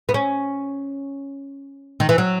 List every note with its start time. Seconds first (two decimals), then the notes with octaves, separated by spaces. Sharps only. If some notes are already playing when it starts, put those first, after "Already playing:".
0.09 B3
0.14 C#4
2.00 D#3
2.09 E3
2.18 F#3